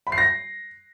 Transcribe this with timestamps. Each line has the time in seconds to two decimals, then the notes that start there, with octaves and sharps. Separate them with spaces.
0.07 B5
0.12 C7
0.18 A#6